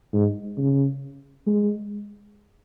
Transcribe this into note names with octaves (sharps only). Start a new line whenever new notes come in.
G#2
C#3
G#3